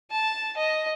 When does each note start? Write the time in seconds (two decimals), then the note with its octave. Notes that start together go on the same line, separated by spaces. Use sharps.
0.12 A5
0.57 D#5